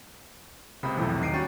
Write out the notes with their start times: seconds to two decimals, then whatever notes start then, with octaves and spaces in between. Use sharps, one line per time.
0.83 C#2 C3 A#3 C5 B5 D#6
0.97 B1 E2 A2 C3 F3
1.21 D#2 D#4 C7 D7 D#7
1.33 G3 C#4 F#4 G5 C#6 A6